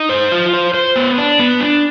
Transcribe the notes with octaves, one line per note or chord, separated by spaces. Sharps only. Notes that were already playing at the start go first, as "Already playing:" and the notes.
Already playing: D#4
C5
F4
C5
C5
B3
D4
B3
D4